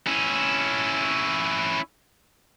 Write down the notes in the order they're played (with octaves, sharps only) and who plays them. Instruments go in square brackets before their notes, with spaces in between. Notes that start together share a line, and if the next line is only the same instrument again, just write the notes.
[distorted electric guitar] C#4 E4